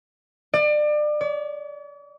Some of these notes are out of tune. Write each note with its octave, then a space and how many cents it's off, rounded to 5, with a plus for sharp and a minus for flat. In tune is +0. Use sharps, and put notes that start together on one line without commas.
D5 +30
D5 -45